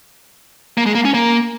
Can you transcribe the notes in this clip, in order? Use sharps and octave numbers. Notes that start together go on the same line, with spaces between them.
A#3
G#3
A#3
C#4
A#3